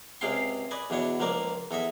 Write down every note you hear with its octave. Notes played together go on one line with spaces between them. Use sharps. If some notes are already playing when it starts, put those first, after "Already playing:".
C#2 C3 G#4 F5 G5 C6
B4 D5 D#5 G#5
E2 B2 D4 C#5
C#2 F3 A#3 A#4 D5
E2 A4 D#5 E5